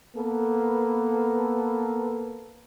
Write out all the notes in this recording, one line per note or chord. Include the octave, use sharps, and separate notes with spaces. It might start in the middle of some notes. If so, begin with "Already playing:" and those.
A#3 B3 A4 B4